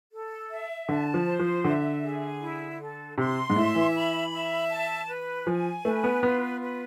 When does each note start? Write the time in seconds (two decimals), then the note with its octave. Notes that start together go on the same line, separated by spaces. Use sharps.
0.12 A4
0.50 E5
0.89 D3 A5
1.14 F3
1.27 C5
1.39 F3
1.65 D3 E5
2.04 G#4
2.41 E4
2.80 A4
3.18 C3 C6
3.50 G#2
3.56 A2 E5
3.75 E3
3.95 B5
4.32 E5
4.70 A5
5.08 B4
5.46 F3 G#5
5.85 A3 B4
6.04 B3
6.23 B3 F4
6.61 B4